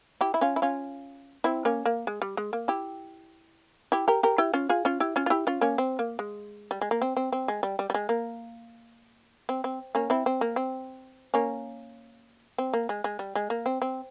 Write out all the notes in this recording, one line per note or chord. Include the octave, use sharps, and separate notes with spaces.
E4 G4
E4
C#4 F4
E4
C#4 F4
C4 E4
A#3 C#4
A#3
G#3
G3
G#3
A#3
E4 G4
E4 G4
G4 A#4
G4 A#4
E4 G4
C#4 F4
F4 G#4
C#4 F4
E4 G4
C#4 F4
F4
E4 G4
C#4 F4
A#3 C#4
C4
A#3
G#3
G3
G#3
A#3
C4
C4
C4
G#3
G3
G3
G3
G#3
A#3
C4
C4
A#3 C#4
C4 E4
C4
A#3
C4
A#3 C#4
C4
A#3
G#3
G#3
G3
G#3
A#3
C4
C4